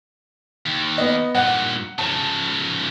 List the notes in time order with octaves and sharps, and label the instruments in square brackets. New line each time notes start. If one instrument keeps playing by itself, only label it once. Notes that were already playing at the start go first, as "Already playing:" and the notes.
[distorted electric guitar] D#2
[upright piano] B3 D#5
[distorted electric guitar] G2 A#2 [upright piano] F#5
[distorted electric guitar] C#3 F3 [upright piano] A5